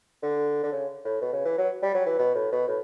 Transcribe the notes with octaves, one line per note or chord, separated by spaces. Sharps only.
D3
D3
C#3
A2
B2
C#3
E3
F#3
G3
F#3
E3
B2
A2
B2
A2